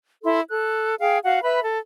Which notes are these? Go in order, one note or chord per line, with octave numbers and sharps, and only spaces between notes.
E4 A4 C6
A4 F#6
G#4 F5 G5
F#4 F5 F#5
B4 E5 B5
A4